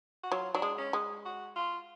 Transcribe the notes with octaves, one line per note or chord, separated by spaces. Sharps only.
F#4
F#3 F4
F#3 D4
G#3
C#4
G#3
F#4
F4